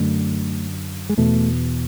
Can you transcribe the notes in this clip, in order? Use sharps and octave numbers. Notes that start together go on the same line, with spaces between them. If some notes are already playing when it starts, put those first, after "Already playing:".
Already playing: F#2 D3 A3
G#3
E2 B2 A3